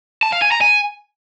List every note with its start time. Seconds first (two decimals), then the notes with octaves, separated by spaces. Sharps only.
0.23 A5
0.32 F5
0.42 G#5
0.52 A#5
0.61 G#5